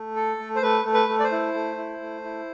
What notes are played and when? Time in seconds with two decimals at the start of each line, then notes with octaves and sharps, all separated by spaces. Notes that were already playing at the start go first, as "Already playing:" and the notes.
Already playing: A3
0.16 A4
0.39 A3
0.56 C5
0.62 A3 B4
0.85 A3
0.94 B4
1.09 A3
1.20 D5
1.24 C5
1.32 E4
1.54 A3
1.77 E4
2.01 A3
2.24 E4